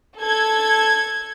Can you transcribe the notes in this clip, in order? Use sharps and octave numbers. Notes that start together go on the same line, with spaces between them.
A4 G#6